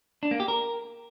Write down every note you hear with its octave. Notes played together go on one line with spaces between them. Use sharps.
D4
A#3
G4
A#4